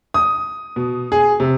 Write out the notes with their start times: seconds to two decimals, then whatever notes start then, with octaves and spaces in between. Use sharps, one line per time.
0.14 D#6
0.76 B2
1.12 G#4
1.40 C3